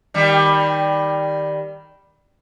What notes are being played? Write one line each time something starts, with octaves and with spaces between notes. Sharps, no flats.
D#3 G3